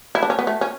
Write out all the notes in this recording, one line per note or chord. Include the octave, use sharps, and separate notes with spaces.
E4
D4
C#4
B3
A3
C#4